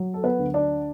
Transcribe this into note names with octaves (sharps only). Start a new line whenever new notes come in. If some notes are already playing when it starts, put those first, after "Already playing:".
Already playing: F#3
A4
B3 B4
D2
D4 D5